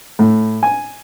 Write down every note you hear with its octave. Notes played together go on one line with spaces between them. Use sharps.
A2
G#5